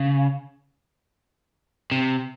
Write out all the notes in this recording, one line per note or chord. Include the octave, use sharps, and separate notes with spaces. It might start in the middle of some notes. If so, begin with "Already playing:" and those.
Already playing: C#3
C3